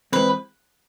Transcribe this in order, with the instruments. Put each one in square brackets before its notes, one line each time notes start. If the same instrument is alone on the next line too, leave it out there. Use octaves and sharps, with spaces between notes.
[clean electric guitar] E3 G#3 C4 [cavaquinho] B4